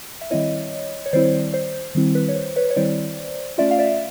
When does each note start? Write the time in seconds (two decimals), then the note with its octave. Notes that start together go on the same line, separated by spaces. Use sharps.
0.21 E5
0.31 D#3 G3 C4 E4 C#5 D#5
1.06 C#5
1.13 D#3 G3 C4 E4 C5 D5
1.54 C5
1.95 D#3 G3 C4 E4
2.15 B4
2.28 C#5
2.36 C5
2.56 B4 C#5
2.70 C#5
2.76 D#3 G3 C4 E4 C5 D5
3.58 A3 C#4 F4 D5 E5
3.71 F5
3.79 D5 E5